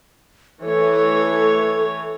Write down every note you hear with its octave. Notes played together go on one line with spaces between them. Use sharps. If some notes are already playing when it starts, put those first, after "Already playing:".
E3 A3 A4 C#5